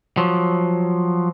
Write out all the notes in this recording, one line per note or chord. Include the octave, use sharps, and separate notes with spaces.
F3 F#3